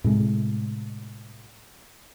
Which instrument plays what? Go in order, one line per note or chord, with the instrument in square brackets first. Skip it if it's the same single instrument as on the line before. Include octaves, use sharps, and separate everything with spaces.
[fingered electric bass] A2 C3 G#3